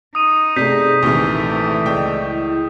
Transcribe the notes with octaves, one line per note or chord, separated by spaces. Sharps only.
D#4 D#6 D#7
C3 A3 G#4 D5 G6 B6 C7
A#1 C3 D#3 E3 A3 G#5 C#6
C#2 D5 D#5 G5 C#6
E4